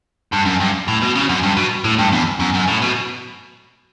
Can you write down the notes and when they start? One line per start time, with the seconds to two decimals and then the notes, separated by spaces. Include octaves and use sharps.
0.33 G2
0.46 F#2
0.61 G2
0.88 A2
1.02 B2
1.15 C#3
1.29 F#2
1.43 G2
1.57 B2
1.84 A2
1.98 G2
2.12 E2
2.40 F#2
2.54 F#2
2.68 A2
2.82 B2